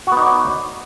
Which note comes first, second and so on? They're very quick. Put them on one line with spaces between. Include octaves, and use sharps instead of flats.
F#4 B3 D#4 D5 C#5